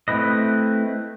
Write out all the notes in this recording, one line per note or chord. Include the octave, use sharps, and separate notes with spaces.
A3 C4 E4 B4 D#5